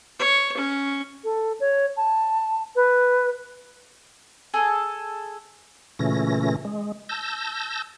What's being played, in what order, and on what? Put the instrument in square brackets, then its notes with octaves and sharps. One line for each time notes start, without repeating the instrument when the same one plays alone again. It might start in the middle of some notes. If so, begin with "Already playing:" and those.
[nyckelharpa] C#5
C#4
[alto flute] A4
C#5
A5
B4
[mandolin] G#4 A4 G#5
[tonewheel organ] A#2 C#3 E3 A3 C#4 A#6
G#3
A5 E6 G6 A#6